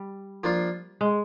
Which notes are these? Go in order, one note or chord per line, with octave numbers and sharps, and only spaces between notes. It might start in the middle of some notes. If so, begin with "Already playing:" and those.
Already playing: G3
F3 A#3 D4 F4
G#3